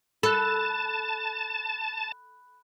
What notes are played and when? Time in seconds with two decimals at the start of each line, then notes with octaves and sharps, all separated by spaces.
0.23 A4 A5 B5 F#6